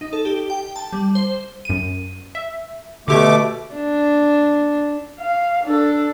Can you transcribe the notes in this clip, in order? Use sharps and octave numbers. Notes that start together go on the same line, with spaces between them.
D#4
A4
G4
G5
A5
G3
C5
F#2 D#7
E5
B2 D3 A3 G4 C#6 D6
D4
F5
D4 A4